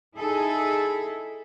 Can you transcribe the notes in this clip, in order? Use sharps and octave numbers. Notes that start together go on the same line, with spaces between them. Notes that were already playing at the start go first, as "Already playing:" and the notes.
D#4 E4 G#4 A4